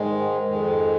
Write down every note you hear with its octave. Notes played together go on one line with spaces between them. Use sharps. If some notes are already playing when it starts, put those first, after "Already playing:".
Already playing: G#2 D#3 G#3
F2 D#3 G#3